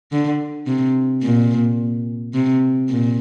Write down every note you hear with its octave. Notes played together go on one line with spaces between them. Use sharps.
D3
C3
A#2
C3
A#2